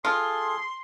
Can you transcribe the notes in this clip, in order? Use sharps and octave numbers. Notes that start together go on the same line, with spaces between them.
F4 G#4 A4 C6